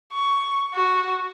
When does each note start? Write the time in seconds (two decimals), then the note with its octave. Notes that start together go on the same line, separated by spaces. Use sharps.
0.12 C#6
0.74 F#4